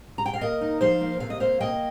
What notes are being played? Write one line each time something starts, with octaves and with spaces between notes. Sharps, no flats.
A#5
G5
F5
A#3 A#4 D#5
D#4
F3 C5 F5
A#3
C3 F5
D#5
A#3 C5 F5
A#3 D#5 G5